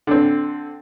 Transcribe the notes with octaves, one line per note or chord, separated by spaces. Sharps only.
D3 C4